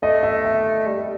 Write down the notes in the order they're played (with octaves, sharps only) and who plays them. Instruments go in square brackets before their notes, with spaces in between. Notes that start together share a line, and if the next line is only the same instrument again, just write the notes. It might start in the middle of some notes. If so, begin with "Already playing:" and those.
[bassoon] A3 [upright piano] D#5
[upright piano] E5
E5
[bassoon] G3